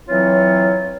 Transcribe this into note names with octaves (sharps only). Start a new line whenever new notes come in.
E3 F#3 C4 F4 C#5